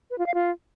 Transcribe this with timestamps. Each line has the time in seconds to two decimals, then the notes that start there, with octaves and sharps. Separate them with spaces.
0.10 B4
0.18 F4
0.26 F5
0.34 F4